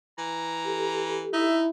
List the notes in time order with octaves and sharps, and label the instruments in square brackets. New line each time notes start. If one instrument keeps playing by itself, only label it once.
[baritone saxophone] E3 [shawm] A#5
[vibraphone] G4 A4
[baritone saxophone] D#4 [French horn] E4 [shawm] E5